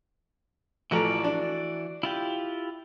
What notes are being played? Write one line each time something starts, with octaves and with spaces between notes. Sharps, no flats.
A1 E3 F3 F#4 D5 A#5
D4
E4 F4 G4